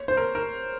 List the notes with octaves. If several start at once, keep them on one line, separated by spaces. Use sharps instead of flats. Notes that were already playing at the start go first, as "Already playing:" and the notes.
Already playing: C#5
C5
A#4
A#4